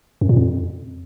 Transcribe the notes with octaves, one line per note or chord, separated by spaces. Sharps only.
F#2
A#2
F2